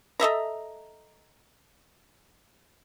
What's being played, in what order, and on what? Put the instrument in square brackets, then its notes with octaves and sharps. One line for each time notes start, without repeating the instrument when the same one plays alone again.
[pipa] A4 D#5 E5 A#5